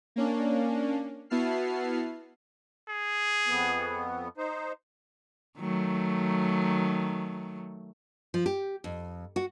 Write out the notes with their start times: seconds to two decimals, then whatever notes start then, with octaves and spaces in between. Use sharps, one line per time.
0.16 A#3 C#4 D4
1.30 B3 E4 F#4 A5 F6 C7
2.89 G#4
3.47 F2 B3
4.37 D#4 C5
5.59 D#3 F#3 A3
8.34 F3
8.46 G4
8.84 F2
9.36 F#4